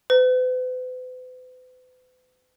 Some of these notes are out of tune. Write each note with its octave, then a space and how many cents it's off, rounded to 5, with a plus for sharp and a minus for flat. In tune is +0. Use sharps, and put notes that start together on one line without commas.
B4 +45